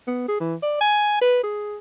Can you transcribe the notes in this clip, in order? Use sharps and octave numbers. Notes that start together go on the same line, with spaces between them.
B3
G#4
E3
D5
G#5
B4
G#4